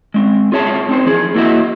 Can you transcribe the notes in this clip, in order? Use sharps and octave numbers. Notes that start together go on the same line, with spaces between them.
G#3 C4
F4 G#4 C#5 E5 A5
C4 D#4 C5
E3 F3 G#4
A#3 E4 F#4 D#5 E5